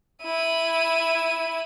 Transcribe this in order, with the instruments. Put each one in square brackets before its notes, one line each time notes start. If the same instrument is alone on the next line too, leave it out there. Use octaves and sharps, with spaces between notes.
[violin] E4 D#7